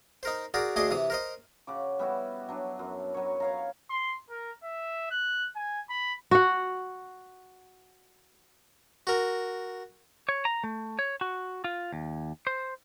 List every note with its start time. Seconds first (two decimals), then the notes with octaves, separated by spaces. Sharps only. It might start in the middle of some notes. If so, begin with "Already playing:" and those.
0.23 D#4 A#4 C5
0.54 F#4 G#4 A#4 D5
0.76 D2 D4 G#4 D#5 C6 D6
0.91 C3 E3 D#6
1.10 A#4 C5 D#5
1.67 C#3 F#4 D6
1.99 G3 B3 E4 F#4
2.49 F#3 D4
2.79 F#2
3.14 F#3 C#5
3.40 C#5 F5 A#5
3.90 C6
4.30 A#4
4.63 E5
5.11 F#6
5.56 G#5
5.90 B5
6.31 F#4 F#5
9.07 F#4 A#4
10.29 C#5
10.45 A#5
10.64 A3
10.99 C#5
11.21 F#4
11.64 F4
11.93 D#2
12.47 C5